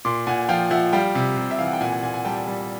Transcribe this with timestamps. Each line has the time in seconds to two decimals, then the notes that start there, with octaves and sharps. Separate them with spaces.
0.05 A#2 C6 D6
0.27 A#2 F#5 G#5
0.49 F3 F5 G5
0.71 F3 E5 F#5
0.93 G3 F5 G5
1.15 C3
1.37 C3
1.51 E5
1.59 E3 F5
1.66 F#5
1.73 G5
1.81 A#2 F#5 G#5
1.92 F#5 G#5
2.03 A#2 F#5 G#5
2.14 F#5 G#5
2.25 G3 G5 A5
2.47 G3